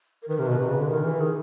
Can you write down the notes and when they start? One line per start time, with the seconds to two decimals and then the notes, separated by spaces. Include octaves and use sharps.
0.22 A#4
0.29 D#3 B4
0.37 C3 A#4
0.44 B2 B4
0.59 C3
0.69 C#3
0.80 D3
0.89 D#3 A#4
1.05 E3
1.20 D#3 G#4